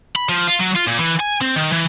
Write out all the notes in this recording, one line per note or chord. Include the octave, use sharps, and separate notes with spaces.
B5
F3
F4
F#3
F4
A#2
E3
G#5
C4
D#3
E3